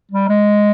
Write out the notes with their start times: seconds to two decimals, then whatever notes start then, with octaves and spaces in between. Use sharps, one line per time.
0.11 G3
0.29 G#3